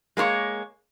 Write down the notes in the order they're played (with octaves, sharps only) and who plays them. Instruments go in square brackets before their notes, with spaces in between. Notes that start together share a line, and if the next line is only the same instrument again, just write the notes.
[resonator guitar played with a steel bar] G#3 A#3 E4 C#5